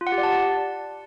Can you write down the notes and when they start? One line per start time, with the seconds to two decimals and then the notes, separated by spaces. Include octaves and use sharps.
0.01 F4
0.07 F#5
0.12 G4
0.18 D5
0.23 A5